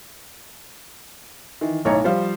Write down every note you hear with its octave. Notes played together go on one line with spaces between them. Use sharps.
D#3 E3
B1 A2 D#4 C#5 A#5
F3 G3 C5 F5